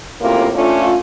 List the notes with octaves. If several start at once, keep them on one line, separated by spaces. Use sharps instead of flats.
F#2 A2 C3 A#3 F4
A3 C#4 D4 F4